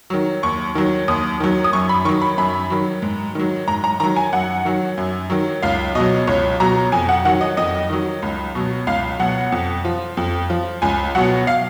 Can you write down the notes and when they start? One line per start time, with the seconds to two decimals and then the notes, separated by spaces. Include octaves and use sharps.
0.10 D#3 F#3
0.43 D#2 C#6
0.75 D#3 F#3
1.08 D#2 D#6
1.40 D#3 F#3
1.64 D#6
1.73 F#2 C#6
1.89 B5
2.05 D#3 C#6
2.09 F#3
2.22 B5
2.38 F#2 B5
2.70 D#3 F#3
3.02 G#2
3.35 D#3 F#3
3.68 G#2 A#5
3.84 A#5
4.00 D#3 F#3 A#5
4.16 G#5
4.33 F#2 F#5
4.65 D#3 F#3
4.98 F#2
5.30 D#3 F#3
5.62 C#2 F5
5.95 B2 F#3 D#5
6.27 C#2 C#5
6.60 B2 F#3 A#5
6.92 F2 G#5
7.09 F#5
7.25 D#3 F#3 F#5
7.41 D#5
7.57 F2 D#5
7.90 D#3 F#3
8.22 C#2
8.55 B2 F#3
8.87 C#2 F5
9.19 B2 F#3 F#5
9.52 F2
9.85 F3
10.17 F2
10.50 F3
10.82 C#2 G#5
11.15 B2 F#3 F#5
11.47 F5